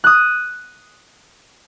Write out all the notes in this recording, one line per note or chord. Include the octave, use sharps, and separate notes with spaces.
D#6 F#6